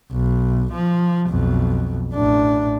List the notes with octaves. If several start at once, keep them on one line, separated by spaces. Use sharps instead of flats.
B1
F3
B1 F2
A1 D4